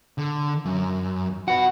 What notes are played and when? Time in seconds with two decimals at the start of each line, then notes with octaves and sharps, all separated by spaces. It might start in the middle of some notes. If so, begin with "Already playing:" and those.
0.18 D3
0.65 F#2
1.48 F#4 B4 F#5